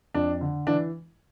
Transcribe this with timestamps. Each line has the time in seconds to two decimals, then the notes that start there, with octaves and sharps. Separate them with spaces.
0.14 F2 D4
0.41 D3
0.67 E3 D4